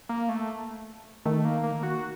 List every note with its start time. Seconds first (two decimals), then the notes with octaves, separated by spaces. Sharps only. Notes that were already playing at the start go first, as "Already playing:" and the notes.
0.09 A#3
0.29 A3
1.25 D#3 A3
1.45 A#3
1.63 A#3
1.83 F#4